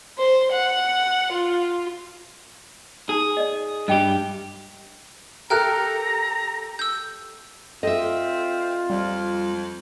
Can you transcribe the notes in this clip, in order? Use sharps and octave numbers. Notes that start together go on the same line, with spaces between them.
C5
F#5
F4
D#4 G#4
D5 D#5
G2 G4 D#5 G5
G4 A4 A#4 G5 A#5 F6 F#6
E6 G6
C4 F4 A4 D#5 E5
F2 G3